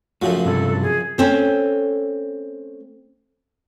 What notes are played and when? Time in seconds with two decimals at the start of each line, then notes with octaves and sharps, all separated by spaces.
0.22 F#2 C#3 F3 A3 F#4
0.45 G2 C3 F#3 A4
0.82 G#4
1.18 A3 C4 C#4